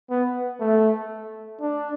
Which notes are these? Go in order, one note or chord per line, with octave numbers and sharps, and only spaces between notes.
B3
A3
D4